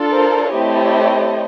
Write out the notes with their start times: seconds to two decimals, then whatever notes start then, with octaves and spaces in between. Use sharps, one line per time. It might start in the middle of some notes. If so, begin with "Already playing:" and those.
Already playing: D4 F4 A4
0.11 A#4 C5
0.52 A3 C4 E4 G4 C#5 D#5